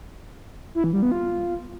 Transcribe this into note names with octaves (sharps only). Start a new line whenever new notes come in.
E4
E3
G3
B3
F4